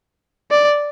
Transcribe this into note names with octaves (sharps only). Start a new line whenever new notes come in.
D5